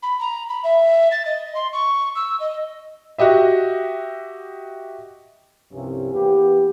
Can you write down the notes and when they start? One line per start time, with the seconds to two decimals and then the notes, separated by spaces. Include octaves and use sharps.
0.03 B5
0.20 A#5
0.49 B5
0.64 E5
1.11 A6
1.25 D#5
1.55 C6
1.73 C#6
2.16 E6
2.40 D#5
3.18 F#4 G4 D#5 E5
5.73 C2 G2 C3 F3 C#4
6.12 E2 A#3 B3 G4